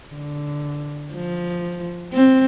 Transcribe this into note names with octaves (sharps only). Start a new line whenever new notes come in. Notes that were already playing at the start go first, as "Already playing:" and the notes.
D3
F3
C4